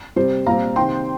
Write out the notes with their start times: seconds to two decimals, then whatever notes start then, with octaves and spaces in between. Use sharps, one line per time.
0.16 C3 G3 C4 C5
0.46 A#2 G3 C4 F5 A#5
0.76 C3 D#3 C4 G5 C6